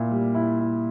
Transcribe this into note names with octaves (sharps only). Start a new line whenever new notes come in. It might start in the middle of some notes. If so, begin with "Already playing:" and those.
Already playing: A#2 E4
G3
E4
E4